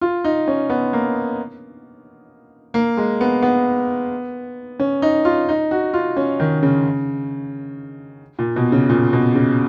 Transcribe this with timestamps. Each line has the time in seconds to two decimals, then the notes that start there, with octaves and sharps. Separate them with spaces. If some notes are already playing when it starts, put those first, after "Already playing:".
0.01 F4
0.24 D#4
0.48 C#4
0.70 B3
0.93 A#3
2.74 A#3
2.97 G#3
3.21 B3
3.43 B3
4.80 C#4
5.02 D#4
5.25 F4
5.49 D#4
5.71 F#4
5.94 F4
6.17 C#4
6.40 D#3
6.63 C#3
8.39 A#2
8.56 B2
8.72 C#3
8.89 A#2
9.13 B2
9.35 C#3